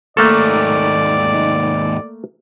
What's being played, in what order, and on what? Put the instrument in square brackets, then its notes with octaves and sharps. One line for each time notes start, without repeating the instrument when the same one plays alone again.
[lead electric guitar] D#2 G#2 [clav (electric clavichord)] A3 A#3 A4 [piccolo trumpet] D5